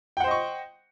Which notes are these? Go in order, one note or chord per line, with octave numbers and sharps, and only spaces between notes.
C5 D#5 F#5 G5 C#6